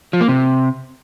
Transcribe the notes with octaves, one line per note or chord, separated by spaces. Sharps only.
F3
A#3
C3